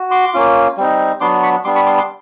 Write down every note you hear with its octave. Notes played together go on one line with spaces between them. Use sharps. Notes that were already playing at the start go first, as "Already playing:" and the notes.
Already playing: F#4
C6 D6
A#3 C#4 F4
G3 C4 D#4
F#3 B3 D4 C6 D6
B5 C#6
G3 B3 D4 C6 D6
B5 C#6
C6 D6
C6 D6